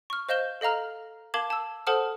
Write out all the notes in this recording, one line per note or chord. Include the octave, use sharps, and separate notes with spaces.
C#6 F6
C5 D#5 F5 G6 E7 G7
A4 D#5 F5 A#5 F6
A#4 F5 A5 D6 G#6 F#7
A5 E6
A4 C5 F#5 A5 D#6 F6